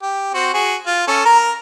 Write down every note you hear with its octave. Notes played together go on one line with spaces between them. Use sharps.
G4
C4 F#4
F#4 G#4
F4
C#4 A4
A#4 A#5